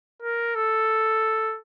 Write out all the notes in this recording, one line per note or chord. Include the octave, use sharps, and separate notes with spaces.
A#4
A4